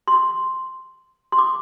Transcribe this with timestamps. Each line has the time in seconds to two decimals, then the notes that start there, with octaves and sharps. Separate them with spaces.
0.08 C6
1.32 C6
1.39 D6